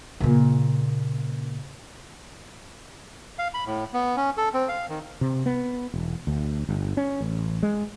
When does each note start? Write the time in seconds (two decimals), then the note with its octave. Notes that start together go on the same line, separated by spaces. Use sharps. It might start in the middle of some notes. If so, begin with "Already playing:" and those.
0.20 A#2 C#3
3.39 F5
3.54 B5
3.66 A2
3.94 B3
4.17 C#4
4.37 A4
4.54 C4
4.69 F5
4.89 D#3
5.21 C3
5.46 B3
5.94 E1
6.27 D2
6.69 G1
6.97 C#4
7.21 A1
7.63 G#3